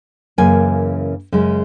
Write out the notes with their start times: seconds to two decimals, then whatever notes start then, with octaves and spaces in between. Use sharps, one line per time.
0.38 F#2 C#3 E3 A#3 G#5
1.32 F#2 C#3 G#3